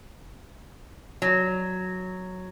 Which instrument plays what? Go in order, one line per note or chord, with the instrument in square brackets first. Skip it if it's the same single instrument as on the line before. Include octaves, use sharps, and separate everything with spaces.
[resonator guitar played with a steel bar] F#3